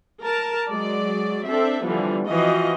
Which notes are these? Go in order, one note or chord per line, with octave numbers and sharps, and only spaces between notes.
A#4 A5
F#3 G#3 D5
C4 D4 A4 E5
D3 E3 F3 G3 B3
E3 F3 C4 F4 F#4 D#5